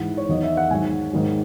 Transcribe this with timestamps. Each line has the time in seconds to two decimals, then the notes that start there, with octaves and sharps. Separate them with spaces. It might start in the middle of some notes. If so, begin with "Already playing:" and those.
Already playing: G#2 E3 F#5
0.17 C#5
0.29 E2 D#3 F#3 D#5
0.44 E5
0.57 F#5
0.71 G#2 D#3 F#3 G#5
1.13 G#2 D#3 F#3